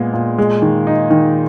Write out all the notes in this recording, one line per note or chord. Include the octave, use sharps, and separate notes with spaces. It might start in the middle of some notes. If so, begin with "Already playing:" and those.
Already playing: A#2 G#3 B3
A#2
G#3
D#3
D#4
D#3